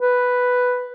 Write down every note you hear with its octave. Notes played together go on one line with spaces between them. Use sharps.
B4